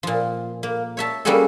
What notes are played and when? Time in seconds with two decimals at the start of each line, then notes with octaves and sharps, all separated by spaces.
0.03 A#2 F3
0.63 A#3
0.97 C#5 E5 A5
1.25 G3 A#3 C#4 F#4 G#4 A4